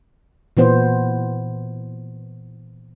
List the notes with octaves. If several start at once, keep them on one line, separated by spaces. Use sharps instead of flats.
A#2 E3 B3 C5